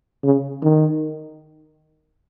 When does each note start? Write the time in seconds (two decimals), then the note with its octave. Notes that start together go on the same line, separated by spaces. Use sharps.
0.24 C#3
0.63 D#3